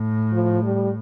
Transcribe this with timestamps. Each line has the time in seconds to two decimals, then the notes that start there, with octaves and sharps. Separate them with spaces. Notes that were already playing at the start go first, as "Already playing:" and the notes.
Already playing: A2
0.33 F3
0.64 G3